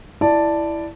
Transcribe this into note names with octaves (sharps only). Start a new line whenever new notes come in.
E4 D5 A5